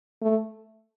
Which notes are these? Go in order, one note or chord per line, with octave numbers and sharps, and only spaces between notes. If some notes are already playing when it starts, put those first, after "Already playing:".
A3